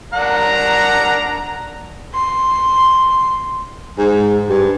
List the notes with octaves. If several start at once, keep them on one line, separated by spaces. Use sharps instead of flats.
D4 A#4 F#5 A#5
C6
G#2
G2